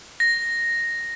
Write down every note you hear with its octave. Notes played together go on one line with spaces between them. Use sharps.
A#6